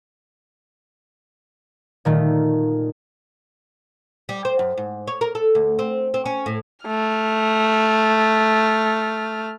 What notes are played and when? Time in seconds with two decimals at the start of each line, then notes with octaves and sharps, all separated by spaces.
2.05 A#2 D#3 A3
4.29 G3
4.45 C5
4.59 F#2
4.77 G#2
5.07 C#5
5.21 A#4
5.35 A4
5.55 D2
5.79 C4
6.14 C4
6.26 C#4
6.46 A2
6.86 A3 F6